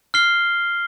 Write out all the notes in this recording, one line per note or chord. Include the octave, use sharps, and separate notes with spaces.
F6 C7 G7